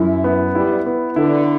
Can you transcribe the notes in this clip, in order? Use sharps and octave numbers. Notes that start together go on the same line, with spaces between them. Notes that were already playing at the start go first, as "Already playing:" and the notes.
Already playing: F#2 E4
B3
G3 E4
B3
D3 E4